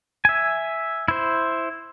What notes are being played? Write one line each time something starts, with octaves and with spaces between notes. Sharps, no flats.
E5 G#5
E4 C5